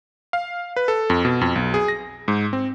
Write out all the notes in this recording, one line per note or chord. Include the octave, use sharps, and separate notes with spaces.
F5
B4
A4
F2
B2
F2
B1
G#4
A#6
G#2
C4